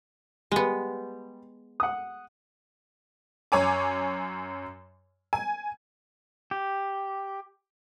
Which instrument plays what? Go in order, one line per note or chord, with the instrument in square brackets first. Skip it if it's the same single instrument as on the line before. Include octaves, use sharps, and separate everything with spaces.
[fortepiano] G3 [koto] G#3 B3
[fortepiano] F#5 D#6
[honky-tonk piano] F#2 C#5 G#5 D6
G#5
[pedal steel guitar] G4